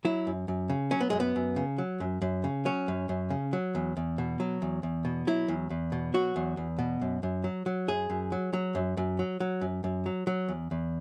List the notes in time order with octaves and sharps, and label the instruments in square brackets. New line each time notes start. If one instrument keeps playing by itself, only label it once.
[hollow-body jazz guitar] F#3 E4
F#2
F#2
C#3
F#3 C#4
B3
F#2 G#3
B3
F#2
C#3
F#3
F#2
F#2
C#3
F#3 C#4
F#2
F#2
C#3
F#3
E2
E2
B2
F#3
E2
E2
B2
F#3 E4
E2
E2
B2
F#3 F#4
E2
E2
B2
F#2
F#2
F#3
F#3
F#2 G#4
F#2
F#3
F#3
F#2
F#2
F#3
F#3
F#2
F#2
F#3
F#3
E2
E2